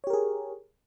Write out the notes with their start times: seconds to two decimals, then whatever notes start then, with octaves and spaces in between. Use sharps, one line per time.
0.04 C#5
0.07 G4
0.10 A#4
0.13 G#4